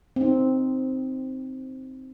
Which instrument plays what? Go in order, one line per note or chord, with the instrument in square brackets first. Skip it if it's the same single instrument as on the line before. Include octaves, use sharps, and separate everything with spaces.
[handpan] C4 D#4